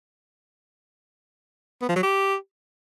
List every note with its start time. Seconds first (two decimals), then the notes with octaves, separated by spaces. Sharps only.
1.82 B3
1.89 F3
1.96 F#3
2.03 G4